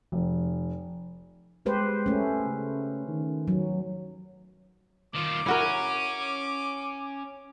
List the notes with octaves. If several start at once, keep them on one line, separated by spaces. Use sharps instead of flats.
F1
G#3 G4 B4 C5
A3 C#4
C#3
D#3
F#3
D#3 F4 D6
C#4 E4 F#4 A#4